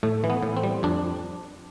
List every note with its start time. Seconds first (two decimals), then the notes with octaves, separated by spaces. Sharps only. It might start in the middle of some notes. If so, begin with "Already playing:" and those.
0.03 A2 A3
0.24 E3
0.30 B3
0.43 A2
0.57 C4
0.63 G3
0.83 F2 D4